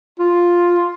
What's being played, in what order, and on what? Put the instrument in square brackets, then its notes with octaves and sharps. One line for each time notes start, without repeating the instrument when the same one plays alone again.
[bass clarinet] F4